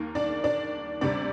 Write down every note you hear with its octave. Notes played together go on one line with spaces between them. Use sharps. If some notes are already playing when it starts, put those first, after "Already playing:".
Already playing: D#2 D#3 A#3
D4 D5
D4 D5
D2 C3 G3 D4 D5